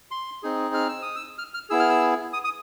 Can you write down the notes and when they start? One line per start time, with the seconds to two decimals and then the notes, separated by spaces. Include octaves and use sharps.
0.11 C6
0.43 C4 D#4 G#4
0.74 F6
0.89 E6
1.02 D#6
1.16 E6
1.38 F6
1.54 F6
1.70 B3 E4 G#4 E6
1.80 F6
1.89 E6
2.33 D#6
2.44 D#6